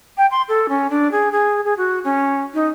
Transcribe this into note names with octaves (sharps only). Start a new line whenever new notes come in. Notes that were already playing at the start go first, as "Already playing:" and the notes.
G5
C6
A4
C#4
D4
G#4
G#4
G#4
F#4
C#4
D#4